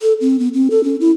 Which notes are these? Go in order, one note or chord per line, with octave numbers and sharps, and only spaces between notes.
A4
C4
B3
C4
A4
C#4
E4